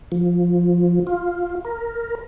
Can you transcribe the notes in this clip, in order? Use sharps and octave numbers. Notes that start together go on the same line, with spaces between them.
F3
F4
A#4